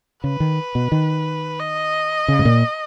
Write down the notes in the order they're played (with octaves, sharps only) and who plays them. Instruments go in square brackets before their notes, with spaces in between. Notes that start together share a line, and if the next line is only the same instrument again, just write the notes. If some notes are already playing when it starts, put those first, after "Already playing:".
[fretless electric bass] C#3 [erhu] B4
[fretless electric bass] D#3
B2
D#3
[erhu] D#5
[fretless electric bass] C#3
G#2
A#2